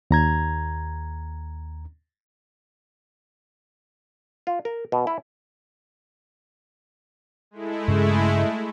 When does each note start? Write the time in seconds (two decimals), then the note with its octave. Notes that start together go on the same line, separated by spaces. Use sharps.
0.11 D#2 A#5 G#6
4.47 F4
4.65 A#4
4.92 B2
5.07 E4
7.51 G#3 A3 E4
7.88 G2 C#3 C#4